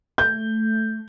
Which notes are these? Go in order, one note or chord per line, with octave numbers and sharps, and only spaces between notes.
A3 G6